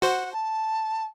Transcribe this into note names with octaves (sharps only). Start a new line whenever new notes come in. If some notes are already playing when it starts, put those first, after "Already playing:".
F#4 C5 F#5
A5